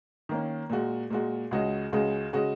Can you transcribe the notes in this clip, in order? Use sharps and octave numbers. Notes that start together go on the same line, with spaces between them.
D#3 A#3 C#4
A#2 G#3 F#4
A#2 G#3 F#4
C#2 C#3 G#3 F#4 D#5
C#2 C#3 G#3 F#4 D#5
C#3 G#3 F#4 D#5